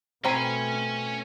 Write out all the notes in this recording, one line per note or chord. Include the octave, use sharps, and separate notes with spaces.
B2 A3 C4 C#4 G#5 A#5 B5